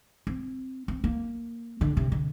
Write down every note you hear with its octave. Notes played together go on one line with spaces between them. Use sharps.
C4
C4
A#3
D3
C3
D3